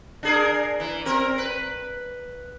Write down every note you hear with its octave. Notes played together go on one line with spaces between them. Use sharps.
D4 G#4 A#4
E3
C4 A#4
B4